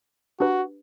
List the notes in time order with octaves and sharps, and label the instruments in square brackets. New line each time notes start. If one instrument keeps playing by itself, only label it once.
[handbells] D4 G4 B4 [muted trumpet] F#4